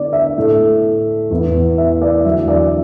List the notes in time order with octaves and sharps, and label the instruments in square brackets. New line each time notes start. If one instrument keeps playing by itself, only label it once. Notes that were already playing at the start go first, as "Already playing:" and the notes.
Already playing: [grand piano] D3 B3 E4 D5
E5
A2 A3 E4
E2 E3 B3 E4
E5
D5
E2 D3 F#3 E5
D5